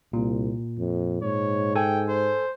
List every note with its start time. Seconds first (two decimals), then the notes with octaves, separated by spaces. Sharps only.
0.13 C2 A#2
0.78 F2
1.22 G#2 C#5
1.75 A4 G5 G#5
2.09 C5